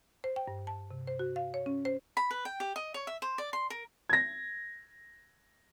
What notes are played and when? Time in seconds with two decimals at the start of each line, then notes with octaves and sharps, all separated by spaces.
0.24 C5
0.36 G5
0.48 G2
0.67 A5
0.91 C3
1.07 C5
1.19 F#4
1.36 F5
1.54 C#5
1.66 C#4
1.85 C5
2.17 B5
2.31 B4
2.45 G5
2.60 G4
2.76 D#5
2.94 C#5
3.07 E5
3.22 C5
3.38 D5
3.53 C6
3.70 A#4
4.09 G#6 A#6